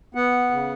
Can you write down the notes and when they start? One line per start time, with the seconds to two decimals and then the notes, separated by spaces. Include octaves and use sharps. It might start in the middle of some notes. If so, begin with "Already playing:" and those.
0.15 B3 F#5
0.51 C#3